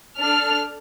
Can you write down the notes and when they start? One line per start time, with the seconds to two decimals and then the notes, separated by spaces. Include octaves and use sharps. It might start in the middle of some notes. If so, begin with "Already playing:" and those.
0.19 D4 A4 F6